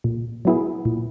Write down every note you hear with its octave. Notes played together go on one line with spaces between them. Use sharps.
A#2
F#3 B3 E4 G#4
A#2